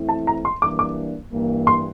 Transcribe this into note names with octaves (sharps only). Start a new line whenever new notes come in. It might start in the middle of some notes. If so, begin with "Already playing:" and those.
Already playing: E3 A3 C4 E4
A5
A#5
C6
E3 G3 A#3 D4 D6
D6
G2 E3 A#3
C6